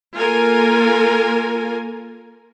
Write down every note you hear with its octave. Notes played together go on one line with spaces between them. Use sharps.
A#3 F4 A4 A#4 G#5